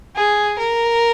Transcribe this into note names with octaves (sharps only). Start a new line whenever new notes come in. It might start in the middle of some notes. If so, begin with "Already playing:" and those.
G#4
A#4